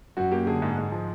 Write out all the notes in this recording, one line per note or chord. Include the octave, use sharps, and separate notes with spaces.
F#2 F#4
A#3 G4
D3 G#4
G#2
G#2
F3